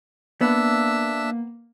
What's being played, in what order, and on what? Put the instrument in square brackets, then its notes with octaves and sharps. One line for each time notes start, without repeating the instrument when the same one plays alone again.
[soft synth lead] A#3 [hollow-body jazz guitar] B3 [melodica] D4 E5 E6